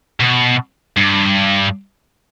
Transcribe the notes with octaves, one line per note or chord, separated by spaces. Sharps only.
B2
G2